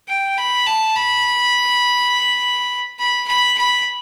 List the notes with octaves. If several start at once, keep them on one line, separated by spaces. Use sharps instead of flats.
G5
B5
A5
B5
B5
B5
B5